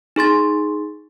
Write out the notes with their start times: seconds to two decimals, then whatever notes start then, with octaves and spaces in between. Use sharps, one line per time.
0.16 D#4 G#4 C6 A6